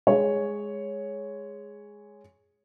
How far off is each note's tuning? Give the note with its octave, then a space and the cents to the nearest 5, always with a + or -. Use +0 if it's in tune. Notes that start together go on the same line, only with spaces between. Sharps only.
G#3 +0 C#5 +0